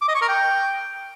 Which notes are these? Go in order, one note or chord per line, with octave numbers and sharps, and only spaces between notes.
D6
D#5
C#6
A#4
G5